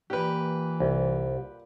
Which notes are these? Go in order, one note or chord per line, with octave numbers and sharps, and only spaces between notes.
A#2 E3 G4 B4
C2